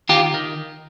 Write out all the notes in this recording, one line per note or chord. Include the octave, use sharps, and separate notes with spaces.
D#3 F4 G4
D#3